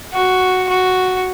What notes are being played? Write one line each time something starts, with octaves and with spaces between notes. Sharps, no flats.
F#4
F#4